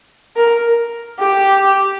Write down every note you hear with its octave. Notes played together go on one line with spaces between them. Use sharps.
A#4
G4